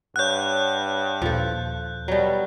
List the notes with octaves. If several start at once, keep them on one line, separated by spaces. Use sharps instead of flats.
G2 C#5 F#5 F#6 G6
D#2 A#2 F3 A4
B2 F#3 G3